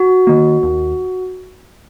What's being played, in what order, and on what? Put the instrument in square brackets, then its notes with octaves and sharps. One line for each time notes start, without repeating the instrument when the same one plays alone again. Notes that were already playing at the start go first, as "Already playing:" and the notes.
Already playing: [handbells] F#4
[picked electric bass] D#3 A#3
D#2